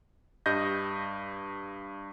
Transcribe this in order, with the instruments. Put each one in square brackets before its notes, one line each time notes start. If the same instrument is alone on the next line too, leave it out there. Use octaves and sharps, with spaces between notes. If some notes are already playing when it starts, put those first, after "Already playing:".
[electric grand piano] G2 G3 D#5 G6 A#6